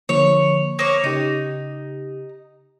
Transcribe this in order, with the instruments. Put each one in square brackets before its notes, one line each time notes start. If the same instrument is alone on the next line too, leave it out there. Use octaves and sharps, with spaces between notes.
[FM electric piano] D3 F3 A#3 [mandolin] C#5
[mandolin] A#3 C#5 [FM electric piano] D#6
[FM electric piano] C#3 G4 [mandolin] D#4